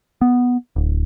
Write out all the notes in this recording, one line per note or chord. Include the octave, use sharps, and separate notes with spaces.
B3
D1